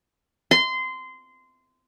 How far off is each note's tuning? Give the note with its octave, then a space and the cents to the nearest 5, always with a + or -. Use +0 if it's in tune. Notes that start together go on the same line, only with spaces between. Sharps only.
C6 -20